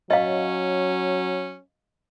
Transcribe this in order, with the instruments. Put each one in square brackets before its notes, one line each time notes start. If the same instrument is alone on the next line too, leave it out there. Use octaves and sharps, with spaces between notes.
[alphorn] F#3 [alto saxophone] C#4 [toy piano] D#5 F5